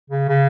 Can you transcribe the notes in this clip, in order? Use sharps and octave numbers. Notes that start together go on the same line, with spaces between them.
C#3
C#3